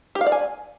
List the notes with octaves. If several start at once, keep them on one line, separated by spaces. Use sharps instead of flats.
G4
F5
D5
G#5